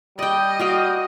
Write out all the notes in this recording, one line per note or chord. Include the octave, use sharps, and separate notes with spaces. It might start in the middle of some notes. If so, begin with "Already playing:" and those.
G3 D5 D#5 G5
F#4 F5 G5